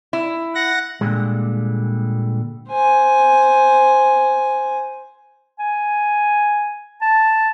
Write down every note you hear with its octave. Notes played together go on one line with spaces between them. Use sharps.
E4
F#5 A#6
A#2 D3 D#3 G3 G#3
C5 G#5
G#5
A5